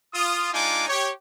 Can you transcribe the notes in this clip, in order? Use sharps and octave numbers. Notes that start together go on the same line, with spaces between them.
F4 D#6
G#3 D4 D#4 F4 G#5 D6
G4 C#5